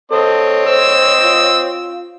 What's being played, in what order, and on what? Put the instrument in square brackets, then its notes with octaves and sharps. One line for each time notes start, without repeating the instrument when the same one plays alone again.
[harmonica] C4 C#5 D#5 [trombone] A4
[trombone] C5 [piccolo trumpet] E6
[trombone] F4